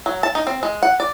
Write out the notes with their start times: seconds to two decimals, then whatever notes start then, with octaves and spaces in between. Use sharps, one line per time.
0.06 F#3
0.23 A5
0.35 D#4
0.47 C4
0.63 G#3
0.83 F#5
1.00 D5